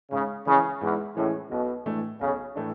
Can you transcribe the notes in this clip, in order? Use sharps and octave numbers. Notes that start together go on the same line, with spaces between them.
G#2 C#3
C#3 E3 G#3 C#4
E2 G#2
A2 E3 G#3 C#4
B1 B2
A2 E3 A3 D4
B1 C#3
A2 E3 A3 D4